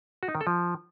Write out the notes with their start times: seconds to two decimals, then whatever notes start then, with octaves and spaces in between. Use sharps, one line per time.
0.23 F#4
0.29 D#4
0.35 D#3
0.41 A4
0.47 F3